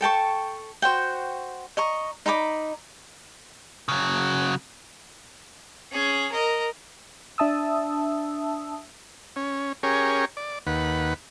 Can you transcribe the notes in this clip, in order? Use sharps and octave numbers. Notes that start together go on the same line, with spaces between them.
A4 G5 A5 C#6
F#4 C5 F#5 G5
D#5 A#5 C#6
D#4 A#5 B5 D6
C#3 F#3
C#4 G#4
A#4 D#5
D4 E5 A5 D#6 E6
C#4
C#4 G4 G#4 A#4 C#5
D5
D#2 B4 F#5